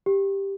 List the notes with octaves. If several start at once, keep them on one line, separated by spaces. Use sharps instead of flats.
G4